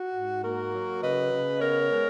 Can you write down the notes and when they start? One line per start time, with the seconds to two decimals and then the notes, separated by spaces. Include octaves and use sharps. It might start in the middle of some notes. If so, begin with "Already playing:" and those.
Already playing: F#4
0.15 G#2
0.43 A#3 F#4 A#4
0.74 F#3
1.02 C#3 B4 D#5
1.32 C#3
1.61 B3 A#4 C#5
1.91 G#3